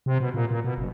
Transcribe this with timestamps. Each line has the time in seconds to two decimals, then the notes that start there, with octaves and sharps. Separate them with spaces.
0.06 C3
0.20 B2
0.34 A#2
0.51 A#2
0.64 B2
0.78 F#1